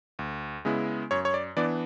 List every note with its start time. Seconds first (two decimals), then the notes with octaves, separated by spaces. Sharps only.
0.19 D2
0.65 C#3 G#3 B3 E4
1.11 F#2 C#5
1.25 C#5
1.34 D5
1.57 E3 B3 D4 D5